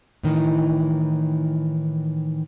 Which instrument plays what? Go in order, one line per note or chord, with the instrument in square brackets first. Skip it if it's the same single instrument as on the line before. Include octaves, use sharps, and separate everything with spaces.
[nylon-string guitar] A2 D#3 E3 D#4